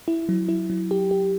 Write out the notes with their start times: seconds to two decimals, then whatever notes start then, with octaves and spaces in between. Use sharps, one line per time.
0.08 E4
0.29 F#3
0.49 E4
0.70 F#3
0.91 G4
1.11 G4